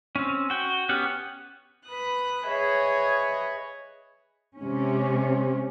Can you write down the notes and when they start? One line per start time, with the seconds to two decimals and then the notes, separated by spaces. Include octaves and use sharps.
0.16 C4 C#4
0.50 F#4 G5
0.89 B3 C#4 G4 F#5
1.86 B4 D#6 F#6
2.47 G#4 B4 C#5 D#5 E5
4.60 C3 G#3 C#4